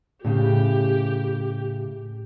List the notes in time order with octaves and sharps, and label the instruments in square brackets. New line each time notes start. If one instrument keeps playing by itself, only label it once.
[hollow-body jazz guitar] A2 C#3 [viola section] G4